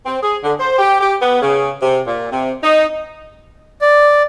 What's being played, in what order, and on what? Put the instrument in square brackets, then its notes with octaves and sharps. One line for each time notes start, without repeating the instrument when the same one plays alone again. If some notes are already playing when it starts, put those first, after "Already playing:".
[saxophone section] C4
G#4
D3
C5
G4
G4
B3
C#3
C3
A#2
C3
D#4
[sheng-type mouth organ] D5